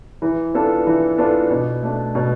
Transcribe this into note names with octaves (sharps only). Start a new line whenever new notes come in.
E3
B3 D4 F4 A4
E3
B3 D4 F4 A4
B2
A3 D4
B2